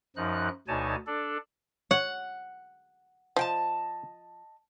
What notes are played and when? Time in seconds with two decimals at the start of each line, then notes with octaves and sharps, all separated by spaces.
0.16 F#2 F3 D#4 F#6
0.68 D2 B2 D#4 C#5 G#5 A5
1.07 D4 A4 D5
1.91 C#5 F#5
3.36 F3 D#5 G5 A5